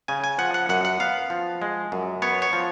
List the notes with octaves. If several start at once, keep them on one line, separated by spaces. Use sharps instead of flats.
C#3 G#5
G#5
F3 F#5
F#5
F#2 F#5
F#5
B3 F5
F3
G#3
F#2
B3 C#5
C#5
F3